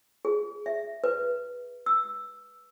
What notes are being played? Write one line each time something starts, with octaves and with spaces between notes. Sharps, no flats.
G#4
E5
B4
E6